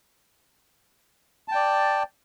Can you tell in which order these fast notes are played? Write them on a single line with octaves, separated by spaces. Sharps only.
A5 G5 D5